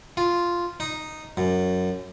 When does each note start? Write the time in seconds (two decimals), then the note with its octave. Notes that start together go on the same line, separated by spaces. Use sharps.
0.17 F4
0.80 D#4
1.37 F#2